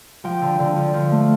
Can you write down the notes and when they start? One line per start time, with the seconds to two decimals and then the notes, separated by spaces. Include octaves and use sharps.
0.24 F3 G5
0.42 D3
0.59 D3
0.76 F3
0.94 F3
1.12 A3